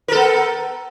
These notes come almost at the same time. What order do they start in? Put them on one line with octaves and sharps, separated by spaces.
A#4 A4 B3